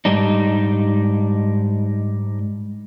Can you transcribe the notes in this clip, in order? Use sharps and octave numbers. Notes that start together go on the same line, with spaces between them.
G#2 G3 D4 D#4